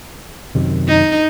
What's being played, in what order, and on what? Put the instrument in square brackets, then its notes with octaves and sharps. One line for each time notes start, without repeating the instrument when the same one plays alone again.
[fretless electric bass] F#2 C3 D#3
[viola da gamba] D#4